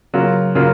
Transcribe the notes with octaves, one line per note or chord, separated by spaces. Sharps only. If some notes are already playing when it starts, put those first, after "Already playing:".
C#3 F#3 A#3 F4
C#3 F#3 A#3 F4